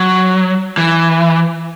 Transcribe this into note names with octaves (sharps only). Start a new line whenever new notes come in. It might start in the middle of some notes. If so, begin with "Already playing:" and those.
Already playing: F#3
E3